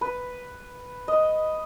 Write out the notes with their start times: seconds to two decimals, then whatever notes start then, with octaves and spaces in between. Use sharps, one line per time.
0.01 B4
1.08 D#5